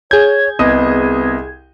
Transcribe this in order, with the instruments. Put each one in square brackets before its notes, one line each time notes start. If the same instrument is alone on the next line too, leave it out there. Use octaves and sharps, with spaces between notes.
[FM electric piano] G#4 G#6 [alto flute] C#5 [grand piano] G6
[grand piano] C2 D#5 D#6 [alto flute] B3